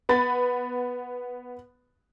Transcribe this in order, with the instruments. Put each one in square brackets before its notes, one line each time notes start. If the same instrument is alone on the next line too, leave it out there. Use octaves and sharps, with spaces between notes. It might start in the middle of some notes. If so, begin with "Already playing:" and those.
[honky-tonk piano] B3 B5 A6